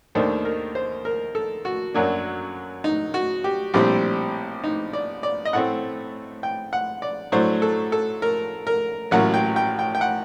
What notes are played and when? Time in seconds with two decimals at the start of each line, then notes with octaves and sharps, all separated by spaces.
0.15 D#2 D#3 A3 D4 C5
0.45 A#4
0.75 C5
1.05 A#4
1.35 A4
1.65 F#4
1.94 F#2 F#3 A#3 D4
2.84 D#4
3.14 F#4
3.44 G4
3.74 A#1 A2 G3 C4 G4
4.64 D#4
4.93 D5
5.23 D5
5.45 D#5
5.53 A2 A3 C4 F#5
6.43 G5
6.73 F#5
7.02 D5
7.32 A2 F#3 A3 D4 C5
7.62 A4
7.92 A4
8.22 A#4
8.67 A#4
9.11 A1 A2 F#3 A#3 F#5
9.34 G5
9.56 G5
9.79 G5
9.95 G5
10.01 F#5